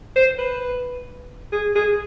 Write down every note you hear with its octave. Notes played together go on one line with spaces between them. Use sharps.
C5
B4
G#4
G#4